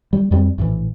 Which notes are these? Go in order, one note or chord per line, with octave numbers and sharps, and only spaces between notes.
G3
F2 G3 C4
A#1 A2 C3 E3